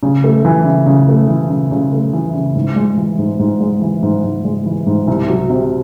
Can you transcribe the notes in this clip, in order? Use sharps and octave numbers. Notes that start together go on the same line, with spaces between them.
C#3
A3
E3
C#3
C#3
A3
E3
C#3
C#3
A3
E3
C#3
G#2
G#3
E3
G#2
G#2
G#3
E3
G#2
G#2
G#3
E3
G#2
C2
F#3
C3